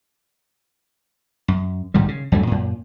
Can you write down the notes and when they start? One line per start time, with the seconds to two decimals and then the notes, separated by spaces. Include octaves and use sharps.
1.48 F#2
1.94 A#1 G#2 D#3 G3
2.08 C#3
2.32 E2 G2 F#3 A3
2.47 F#2 A#2